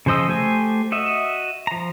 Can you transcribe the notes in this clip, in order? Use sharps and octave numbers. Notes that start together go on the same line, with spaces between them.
C#3 F3 C5 D#5 E6
A3 G4 C5 G#5
F#4 D#5 E5
F3 A#5